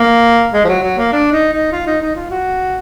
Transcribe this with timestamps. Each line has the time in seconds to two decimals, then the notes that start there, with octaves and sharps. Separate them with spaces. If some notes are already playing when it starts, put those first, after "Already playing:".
Already playing: A#3
0.54 G#3
0.65 F3
0.69 F#3
0.83 F#3
0.98 A#3
1.13 D4
1.33 D#4
1.52 D#4
1.72 F4
1.87 D#4
2.02 D#4
2.16 F4
2.31 F#4